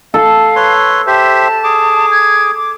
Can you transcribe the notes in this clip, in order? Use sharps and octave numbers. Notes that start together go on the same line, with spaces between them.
A4 F5
B4 C#5 C6
G4 C5 E5 A5
G#4 D6
G#6
D6